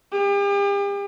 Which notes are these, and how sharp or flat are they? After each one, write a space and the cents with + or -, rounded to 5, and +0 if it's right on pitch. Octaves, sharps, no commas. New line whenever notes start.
G4 +40